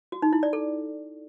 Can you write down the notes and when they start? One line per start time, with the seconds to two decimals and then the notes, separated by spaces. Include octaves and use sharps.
0.12 F#4
0.22 D#4
0.33 E4
0.43 D5
0.53 A4